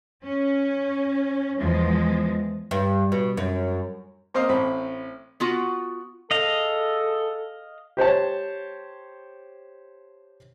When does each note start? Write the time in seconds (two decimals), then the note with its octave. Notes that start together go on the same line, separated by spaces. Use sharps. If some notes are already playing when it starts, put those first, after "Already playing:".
0.24 C#4
1.59 E2 F3 G#3
2.71 G2
3.12 B2
3.37 F#2
4.34 A#3 C4 C5 D#5 F5
4.49 A1 C4 C5 B5
5.40 B3 F4 F#4
6.31 G#4 A4 D#5 F5
7.97 G4 C5 C#5 A5